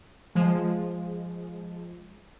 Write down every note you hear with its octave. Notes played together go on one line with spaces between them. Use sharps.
F3 G#3